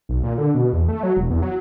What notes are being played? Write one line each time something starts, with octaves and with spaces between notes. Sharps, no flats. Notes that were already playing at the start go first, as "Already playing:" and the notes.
B1
A#2
D3
B2
E2
A3
F#3
E1
E2
F#3